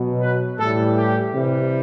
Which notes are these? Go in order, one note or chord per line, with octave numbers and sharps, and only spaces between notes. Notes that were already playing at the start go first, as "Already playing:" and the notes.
Already playing: B2 F#3
B4
A2 E3 G3 A4
G4
C3 E3 G3